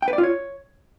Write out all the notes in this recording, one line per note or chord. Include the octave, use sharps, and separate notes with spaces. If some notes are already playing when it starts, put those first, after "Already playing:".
G5
B4
D5
F4
C#5